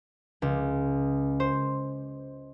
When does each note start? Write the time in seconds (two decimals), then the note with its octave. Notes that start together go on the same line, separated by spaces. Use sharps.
0.42 C#2
1.40 C5